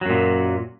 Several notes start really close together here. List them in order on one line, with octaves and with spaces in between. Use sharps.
F#3 F#2 A#2